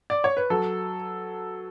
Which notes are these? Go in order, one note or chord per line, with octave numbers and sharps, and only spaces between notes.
D5
C#5
B4
F#3 A4